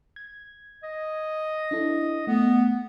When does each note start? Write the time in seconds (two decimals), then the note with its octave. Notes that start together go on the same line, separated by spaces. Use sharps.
0.16 G#6
0.83 D#5
1.71 D4 E4 A4
2.27 A3 B3